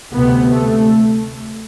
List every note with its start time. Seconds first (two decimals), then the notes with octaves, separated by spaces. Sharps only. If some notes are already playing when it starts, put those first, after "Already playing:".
0.12 D2 C3 B3
0.48 A3